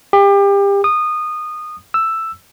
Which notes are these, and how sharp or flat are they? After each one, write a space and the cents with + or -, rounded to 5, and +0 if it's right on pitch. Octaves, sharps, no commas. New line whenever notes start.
G4 +30
D#6 -20
E6 +5